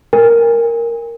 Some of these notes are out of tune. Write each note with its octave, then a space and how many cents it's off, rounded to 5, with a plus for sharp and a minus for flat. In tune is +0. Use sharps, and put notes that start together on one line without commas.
A#4 +0 G#5 -35